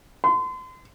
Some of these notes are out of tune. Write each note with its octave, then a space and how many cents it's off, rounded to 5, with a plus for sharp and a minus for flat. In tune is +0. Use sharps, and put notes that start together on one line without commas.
C6 -35